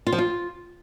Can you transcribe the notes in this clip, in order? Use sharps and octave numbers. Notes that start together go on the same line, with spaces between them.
F4
F3
F4